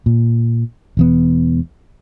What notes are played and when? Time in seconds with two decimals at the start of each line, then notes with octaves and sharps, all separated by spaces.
0.06 A#2
0.97 E1 E2 B3